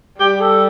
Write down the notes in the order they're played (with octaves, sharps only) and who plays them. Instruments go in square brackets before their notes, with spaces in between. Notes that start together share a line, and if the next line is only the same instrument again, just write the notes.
[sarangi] G3 [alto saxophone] G4
[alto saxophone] A4